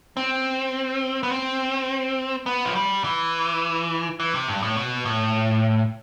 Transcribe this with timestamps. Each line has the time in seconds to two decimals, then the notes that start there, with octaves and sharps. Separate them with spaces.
0.17 C4
1.23 B3
1.32 C4
2.46 B3
2.65 F3
2.75 G3
3.04 E3
4.20 E3
4.34 C3
4.48 G2
4.62 A2
4.77 B2
5.05 A2